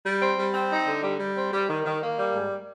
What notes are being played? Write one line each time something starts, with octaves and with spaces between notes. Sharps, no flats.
G3
C4
G3
C4
D#4
D3
G3
G3
C4
G3
D#3
D#3
A#3
G3
G#2